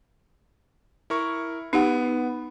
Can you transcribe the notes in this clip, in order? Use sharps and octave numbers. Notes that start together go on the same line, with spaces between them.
E4 A#4 C#6
B3 D#4 G4 F#5